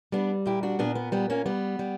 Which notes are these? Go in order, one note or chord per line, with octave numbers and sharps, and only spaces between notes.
G3 B3 D4
A#2 E4 G4
D4 F#4
A#2 B3 D4
B3
G3 B3
A#3 C#4
G3 B3
G3